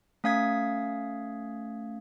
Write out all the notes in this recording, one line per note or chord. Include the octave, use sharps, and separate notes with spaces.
A3 C#4 F5 D#6 G#6 B6